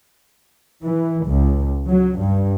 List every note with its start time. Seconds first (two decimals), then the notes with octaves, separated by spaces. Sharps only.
0.82 E3
1.25 C#2
1.86 F#3
2.19 G2